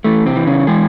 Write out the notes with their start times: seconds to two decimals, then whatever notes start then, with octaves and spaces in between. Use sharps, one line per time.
0.04 E3 A3
0.26 C3 C4
0.36 E3
0.47 C#3 C#4
0.67 E3 G#3 G#4